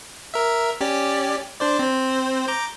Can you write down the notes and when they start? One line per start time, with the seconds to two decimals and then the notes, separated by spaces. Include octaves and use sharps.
0.34 A#4 E5
0.81 C#4 G4 D5
1.60 D4 C5 D5
1.79 C4 C5
2.48 A#5 D6 G6